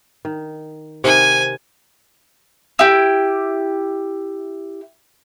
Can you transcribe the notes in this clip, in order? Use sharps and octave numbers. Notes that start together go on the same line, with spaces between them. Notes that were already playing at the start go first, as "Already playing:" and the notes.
D#3
C3 D#3 G#5
E4 G4